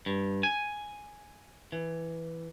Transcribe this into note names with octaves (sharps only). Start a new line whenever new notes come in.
G2
G#5
E3